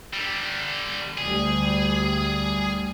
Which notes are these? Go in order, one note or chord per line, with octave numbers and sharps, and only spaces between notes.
D3 G3
D2 G3 G#4